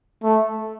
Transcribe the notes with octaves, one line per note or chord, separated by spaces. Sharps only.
A3